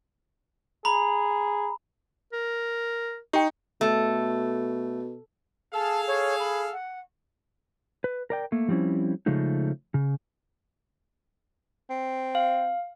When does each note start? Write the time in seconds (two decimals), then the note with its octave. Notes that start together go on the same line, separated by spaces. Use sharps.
0.85 G#4 A#5 B5
2.33 A#4
3.33 D#4 G4 G5
3.81 B2 A3
5.74 G#4 A4 F5 A5
6.07 C#5
6.39 B5
6.72 F#5
8.04 B4
8.30 A#4 D5 G5
8.52 A3 A#3
8.68 F3 G3 C4 C#4 E4
9.26 C#3 F3 G#3 A3 D#4
9.94 C#3
11.90 C4
12.35 F5